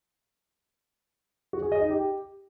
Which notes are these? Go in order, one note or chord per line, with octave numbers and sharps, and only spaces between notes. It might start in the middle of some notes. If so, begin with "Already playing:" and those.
F#4
G#4
D#5
D#4
G4